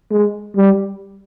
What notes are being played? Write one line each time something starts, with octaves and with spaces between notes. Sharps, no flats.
G#3
G3